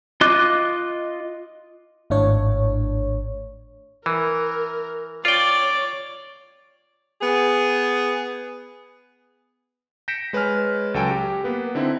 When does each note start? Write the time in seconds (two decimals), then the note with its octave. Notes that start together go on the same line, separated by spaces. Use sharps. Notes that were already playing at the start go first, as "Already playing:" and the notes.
0.21 F4 D#5 D6 F#6
2.10 G#1 A2 D4 C#5
4.06 E3 A#4
5.25 F4 C#5 D5 G5
7.22 B3 G#4
10.08 G6 A#6 B6 C#7 D7 E7
10.33 G#3 B4 C#5 G#5 F6
10.94 C#2 F#3 A4 G5 G#5 D7
11.11 G4
11.44 A#3 B3 B4
11.75 D3 C4 D#4 E4